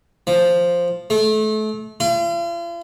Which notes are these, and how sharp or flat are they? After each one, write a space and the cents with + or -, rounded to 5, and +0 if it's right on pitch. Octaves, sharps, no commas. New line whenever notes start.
F3 +0
A3 -30
F4 -45